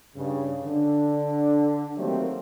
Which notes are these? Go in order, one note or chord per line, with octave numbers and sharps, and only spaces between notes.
G2 C#3
D3 D4
D#3 F#3 G3 A3 A#3 C4